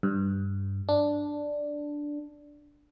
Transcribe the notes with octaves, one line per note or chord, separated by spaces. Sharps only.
G2
D4